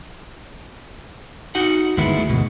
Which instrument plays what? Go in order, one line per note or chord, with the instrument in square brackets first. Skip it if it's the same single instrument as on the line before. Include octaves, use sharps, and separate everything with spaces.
[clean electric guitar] D#4 F#4 F#5
[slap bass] G1 D#2 D#3 [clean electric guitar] G#3 B3 E4
[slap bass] A3
[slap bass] C#2 G#2 [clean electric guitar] B2